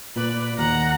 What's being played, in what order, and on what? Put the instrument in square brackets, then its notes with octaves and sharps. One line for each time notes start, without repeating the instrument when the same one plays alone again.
[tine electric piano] A#2 [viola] B4 D5
[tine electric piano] D#2 [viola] F#5 A#5